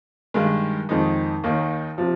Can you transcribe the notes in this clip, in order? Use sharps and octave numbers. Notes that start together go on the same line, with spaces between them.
G2 D#3 G#3
F2 D#3 G#3 D#4
D#2 D#3 A#3 D#4
C3 F3